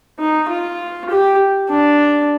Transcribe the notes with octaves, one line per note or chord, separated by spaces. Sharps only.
D#4
F4
G4
D4